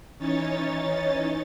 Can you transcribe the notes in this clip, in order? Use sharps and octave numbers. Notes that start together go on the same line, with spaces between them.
E3 C#4 D#4 C#5 A6